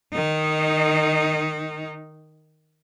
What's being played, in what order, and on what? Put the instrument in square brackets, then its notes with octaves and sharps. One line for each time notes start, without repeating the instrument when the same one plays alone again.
[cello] D#3 D#4